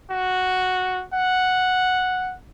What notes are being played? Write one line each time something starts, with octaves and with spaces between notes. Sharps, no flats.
F#4
F#5